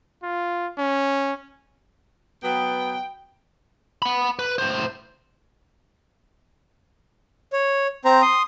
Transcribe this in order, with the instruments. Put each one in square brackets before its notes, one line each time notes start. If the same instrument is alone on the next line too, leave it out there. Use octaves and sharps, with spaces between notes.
[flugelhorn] F4
C#4
[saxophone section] F#3 B3 [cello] G5
[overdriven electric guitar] F#5 B5
B4
A2 C5
[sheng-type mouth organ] C#5
C4 C5 A#5
C6 D#6